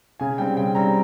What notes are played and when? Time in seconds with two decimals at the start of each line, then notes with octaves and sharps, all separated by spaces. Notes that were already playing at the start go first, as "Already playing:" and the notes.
0.20 C#3 G#5
0.38 G3 C4 G5
0.57 C#3 G5
0.75 G3 C4 A#5